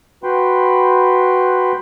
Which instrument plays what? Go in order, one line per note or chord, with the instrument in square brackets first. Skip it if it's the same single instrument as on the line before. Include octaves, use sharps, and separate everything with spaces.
[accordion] F#4 B4 G5 B5 C6